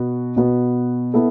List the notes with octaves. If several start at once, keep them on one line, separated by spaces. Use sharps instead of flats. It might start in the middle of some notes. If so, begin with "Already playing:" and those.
Already playing: B2 B3 F#4
B2 B3 F#4
B3 E4 A4